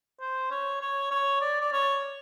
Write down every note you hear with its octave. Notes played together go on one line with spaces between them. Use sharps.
C5
C#5
C#5
C#5
D5
D5
C#5